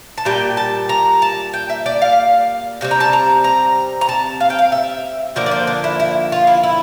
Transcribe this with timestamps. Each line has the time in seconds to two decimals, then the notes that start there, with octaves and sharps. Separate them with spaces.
0.18 A5
0.25 A#2 G3 G5
0.57 A5
0.89 A#5
1.22 A5
1.54 G5
1.70 E5
1.86 D5
2.02 F5
2.81 C3 G3 C4
2.91 A#5
3.00 A5
3.13 A#5
3.44 A#5
4.01 A#5
4.09 A5
4.40 F5
4.50 G5
4.59 F5
4.72 E5
5.36 D3 F3 A#3 D5
5.46 D5
5.51 C5
5.67 D4
5.84 E4
6.00 E4
6.32 F4
6.47 E4
6.63 E4